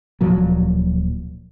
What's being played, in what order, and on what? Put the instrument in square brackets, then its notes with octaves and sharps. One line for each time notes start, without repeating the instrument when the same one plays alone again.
[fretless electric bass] D1 A#2 F3 F#3